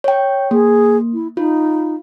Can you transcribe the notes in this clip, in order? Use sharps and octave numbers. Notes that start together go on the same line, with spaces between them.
C#5 G5
A#3 G#4
E4
D#4 F4